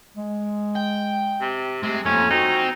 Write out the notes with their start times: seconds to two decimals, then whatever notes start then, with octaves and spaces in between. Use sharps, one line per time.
0.17 G#3
0.76 G5
1.41 C3
1.83 C3 G#3 A3
2.05 F2 A#3 C#4
2.31 C4 D#4 F#4